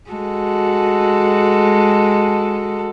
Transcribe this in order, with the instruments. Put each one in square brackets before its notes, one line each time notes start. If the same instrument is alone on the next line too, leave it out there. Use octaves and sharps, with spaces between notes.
[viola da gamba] G#3 F#4 A4